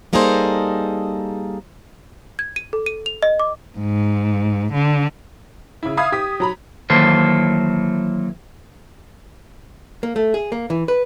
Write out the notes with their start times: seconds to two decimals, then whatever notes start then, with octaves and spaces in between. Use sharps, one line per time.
0.13 G3 A#3 D#4 G#4 A4 C5
2.39 G#6
2.56 D#7
2.73 A4
2.86 D#7
3.06 F7
3.22 D#5
3.40 D6
3.79 G#2
4.73 D3
5.83 C#3 E4
5.97 E5 F5 B5 D#6 G#6
6.12 G4 D#6 B6
6.40 F#3 A#5 B5
6.90 D#3 E3 F#3 A#3 A4 C5
10.03 A#3
10.16 A3
10.34 G#4
10.52 A#3
10.70 E3
10.88 B4